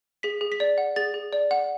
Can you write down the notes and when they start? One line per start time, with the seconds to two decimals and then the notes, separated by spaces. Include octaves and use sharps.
0.23 G#4 B6
0.41 G#4
0.52 B6
0.60 D5
0.78 F#5
0.96 G#4 A6
1.14 G#4
1.33 D5
1.51 F#5